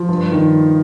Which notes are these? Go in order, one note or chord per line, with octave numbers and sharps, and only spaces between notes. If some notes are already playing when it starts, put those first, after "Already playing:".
Already playing: F3
G2
D#3